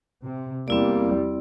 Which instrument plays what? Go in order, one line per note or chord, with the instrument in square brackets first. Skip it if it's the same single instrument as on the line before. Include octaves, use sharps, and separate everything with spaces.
[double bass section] C3
[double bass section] E2 G3 [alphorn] A#3 [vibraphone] C4 E4 D5